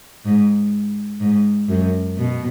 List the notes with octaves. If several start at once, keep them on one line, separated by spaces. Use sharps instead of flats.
G#2
G#2
F#2
B2